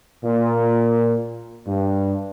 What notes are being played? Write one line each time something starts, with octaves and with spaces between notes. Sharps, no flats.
A#2
G2